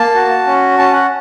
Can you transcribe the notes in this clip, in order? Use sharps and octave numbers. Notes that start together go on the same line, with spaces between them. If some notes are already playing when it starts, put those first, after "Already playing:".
Already playing: A#3 A5
F#4
C#4
C#4 A5
F#5